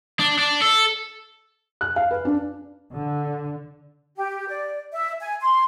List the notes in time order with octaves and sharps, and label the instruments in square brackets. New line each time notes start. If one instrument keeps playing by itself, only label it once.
[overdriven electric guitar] D4
D4
A4
[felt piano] F#6
F5
B4
D4
[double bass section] D3
[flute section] G4
D5
E5
G#5
C6